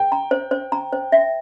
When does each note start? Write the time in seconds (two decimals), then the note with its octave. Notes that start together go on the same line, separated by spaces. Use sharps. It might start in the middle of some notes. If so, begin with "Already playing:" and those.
Already playing: G5
0.12 A#5
0.31 C5
0.51 C5
0.72 A#5
0.93 C5
1.12 E5